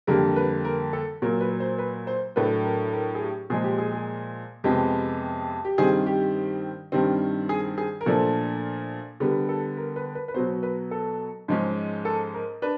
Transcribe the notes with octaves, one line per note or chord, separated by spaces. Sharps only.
F2 D3 G3 A#3 A#4
B4
A#4
A4
A#2 F#3 A#3 A#4
B4
C5
B4
C5
A2 F#3 A3 D4 B4
A#4
A#4
G#4
G4
A#2 F3 G#3 G#4
G4
G#4
G#4
F2 C3 F3 G#3 B3 G4
G4
G2 D#3 G3 C4 G#4
G4
G2 D#3 G3 C4
G#4
G#4
A#4
A#2 F3 A3 D4 A4
D3 G3 B3 A#4
A4
A#4
B4
B4
B4
B2 F#3 B3 C5
B4
A4
G#2 F3 G#3 C#4
A4
A#4
D4 B4